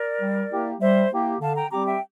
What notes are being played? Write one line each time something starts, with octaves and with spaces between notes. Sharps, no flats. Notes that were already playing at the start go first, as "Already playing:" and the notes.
Already playing: A#4 D5
G3
A#3 E4 G4
G3 C5 E5
A#3 E4 G4
D3 F5 A5
G5 A#5
G3 C4 G4 A#5 D6
E5 G5